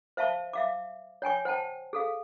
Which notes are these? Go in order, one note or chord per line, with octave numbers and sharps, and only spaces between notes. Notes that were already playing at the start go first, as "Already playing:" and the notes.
C5 E5 F5 A5 C#6
E5 F5 D6
C#5 G5 G#5 C#6
C5 F#5 G5 A5
G#4 A4 F5